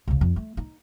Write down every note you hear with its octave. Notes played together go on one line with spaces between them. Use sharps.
C#2 C#3
F2
A3
D#4